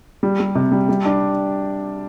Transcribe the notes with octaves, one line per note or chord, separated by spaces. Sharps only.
G3
G3
C3
G3
G3
D4